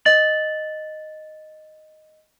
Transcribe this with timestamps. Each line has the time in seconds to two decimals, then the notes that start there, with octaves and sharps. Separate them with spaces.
0.05 D#5 A6 F#7